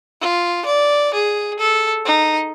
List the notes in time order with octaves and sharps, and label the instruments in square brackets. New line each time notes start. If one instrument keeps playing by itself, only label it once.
[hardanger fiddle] F4
D5
G#4
A4
D#4